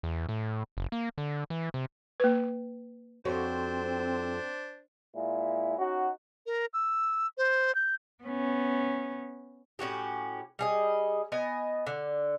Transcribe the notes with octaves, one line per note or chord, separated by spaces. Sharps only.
E2
A2
F#1
A#3
D3
E3
C3
A#3 B4
F2 C4 D4 F#4 C5 C#5
A#2 G#3 E4
C#4 D#4 F#4
A#4
E6
C5
G6
B3 C#4
A2 C#4 F#4 G4
G3 G#4 D#5
B3 D#5 G#5
D3